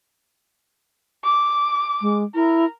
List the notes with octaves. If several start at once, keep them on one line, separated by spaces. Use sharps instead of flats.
D6
G#3
E4 A#4